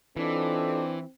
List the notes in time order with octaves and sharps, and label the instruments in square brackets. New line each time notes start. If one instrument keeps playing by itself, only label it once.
[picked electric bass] E3 [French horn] C4 [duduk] D4 [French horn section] D#4 F4 A4